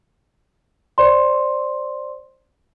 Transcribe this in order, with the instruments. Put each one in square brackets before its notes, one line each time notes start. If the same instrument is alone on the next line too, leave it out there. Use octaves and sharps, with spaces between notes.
[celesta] C5 D5 C6